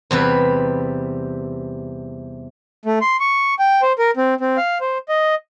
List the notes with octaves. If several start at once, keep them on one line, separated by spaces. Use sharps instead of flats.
E2 C3 G3 B4
A3
C6
C#6
G5
C5
A#4
C4
C4
F5
C5
D#5